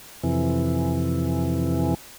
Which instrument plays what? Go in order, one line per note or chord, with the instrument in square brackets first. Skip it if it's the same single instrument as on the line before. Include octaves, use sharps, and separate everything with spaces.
[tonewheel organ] F2 C3 E3